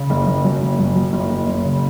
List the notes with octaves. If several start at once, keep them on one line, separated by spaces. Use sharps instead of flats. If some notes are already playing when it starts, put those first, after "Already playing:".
Already playing: C#3
F#1
F#1
F#2
F#1
F#2
F#2
F#1
F#1
F#1
C#3